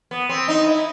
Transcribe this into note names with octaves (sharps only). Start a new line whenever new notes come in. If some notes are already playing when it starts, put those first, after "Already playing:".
B3
C4
D#4
E4